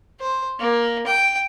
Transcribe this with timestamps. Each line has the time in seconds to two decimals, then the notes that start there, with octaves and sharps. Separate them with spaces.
0.20 C5
0.59 A#3
1.06 G5